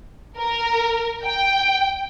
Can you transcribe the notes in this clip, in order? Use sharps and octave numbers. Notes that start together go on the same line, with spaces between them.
A#4
G5